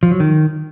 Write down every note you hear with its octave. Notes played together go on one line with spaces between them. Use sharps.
F3
F#3
D#3